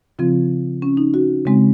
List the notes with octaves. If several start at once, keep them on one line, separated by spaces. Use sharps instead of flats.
C#3 F3 C4 F4
C#4
D#4
F#4
C#3 G#3 C4